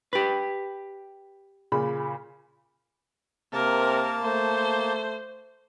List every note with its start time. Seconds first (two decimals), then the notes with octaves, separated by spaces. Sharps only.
0.13 G4 B4
1.72 A#2 C#3 B5
3.53 C3 A#3 A#4 A5
4.23 A3 C5